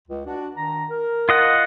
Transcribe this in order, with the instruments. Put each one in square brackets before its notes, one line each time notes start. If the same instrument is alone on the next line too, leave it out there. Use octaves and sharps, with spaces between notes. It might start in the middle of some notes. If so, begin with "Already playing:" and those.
[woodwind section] C#2
D4 F#4
D#3 D4 A#5
A#4
[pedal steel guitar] F4 D#5 F#5